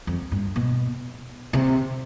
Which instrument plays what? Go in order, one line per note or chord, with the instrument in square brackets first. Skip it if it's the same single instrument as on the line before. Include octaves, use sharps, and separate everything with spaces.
[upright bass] F2
G2
B2
C3